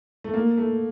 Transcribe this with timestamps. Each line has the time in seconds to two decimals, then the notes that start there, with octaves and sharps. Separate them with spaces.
0.24 A3
0.34 A#3
0.57 A3